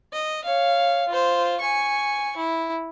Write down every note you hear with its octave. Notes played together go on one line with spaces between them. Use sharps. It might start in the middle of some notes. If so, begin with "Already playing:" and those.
D#5
C#5 F5
F4 C5
G#5 C#6
E4